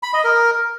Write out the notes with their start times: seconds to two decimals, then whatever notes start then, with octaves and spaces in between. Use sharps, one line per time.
0.03 B5
0.13 D#5
0.24 A#4